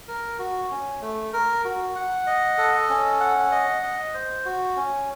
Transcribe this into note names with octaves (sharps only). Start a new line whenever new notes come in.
A#4
F#4
C#4
A3
A#4
F#4
F#5
D#5
A4
C#4
F#5
D#5
D#5
C5
F#4
C#4